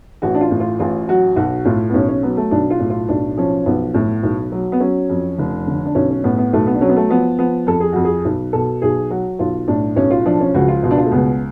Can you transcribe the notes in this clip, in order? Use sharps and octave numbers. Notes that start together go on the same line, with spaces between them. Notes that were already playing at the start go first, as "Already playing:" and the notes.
A1 F#4
D4
F4
A2
F4
A1 F4
F#3 F#4
B1 F#4
A2 F4
B3
B1 C#4
C#4
F#3 B3
A3
B1 D4
F4
A2
F4
B1 D4
F3 C#4
B1 B3
A2
B1
F#3
B3
F#3 C#4
F2
F1
D3
D4
B1 C#4
C#4
A2 B3
B3
B1 A3
B3
D4
F#3 C#4
B3
A3
F3 B3
F3 B3
F2 A4
G#4
F2 F#4
G#4
B1
B2 A4
B1 G#4
F#3 F#4
B1 F4
A2 D4
B1 C#4
F4
F3 D4
C#4
C#2 F#4
F4
B2 F4
D4
F4
A3
C#2 B3